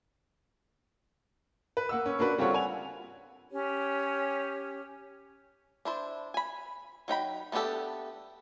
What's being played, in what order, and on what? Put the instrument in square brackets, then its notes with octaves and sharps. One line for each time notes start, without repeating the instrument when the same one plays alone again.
[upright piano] B4
A#3 F#5 E6
C#4
A#3 D4 F#4 B4
G3 C4 F4 A4 C#5 F#5
F#5 G#5 F7
[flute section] C#4 G4 C#5
[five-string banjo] D4 E4 C5
G#5 B5
F#3 D#4 G5 B5
A3 B3 D4 G4 A4